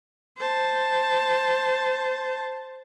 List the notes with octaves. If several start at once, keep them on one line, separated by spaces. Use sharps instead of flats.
C5 A5